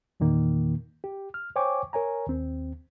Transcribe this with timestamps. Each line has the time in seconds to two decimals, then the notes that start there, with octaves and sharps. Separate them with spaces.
0.20 E2 A#2 D#3 A#3
1.04 G4
1.34 F6
1.56 C5 C#5 G5 G#5 C#6 D6
1.93 A#4 C#5 G#5 A#5
2.27 D#2 C4